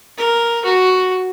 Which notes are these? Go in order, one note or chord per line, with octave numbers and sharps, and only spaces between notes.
A#4
F#4